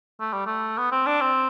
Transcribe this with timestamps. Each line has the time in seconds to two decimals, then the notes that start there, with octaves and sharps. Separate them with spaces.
0.20 A3
0.33 G3
0.46 A3
0.78 B3
0.92 C4
1.07 D4
1.21 C4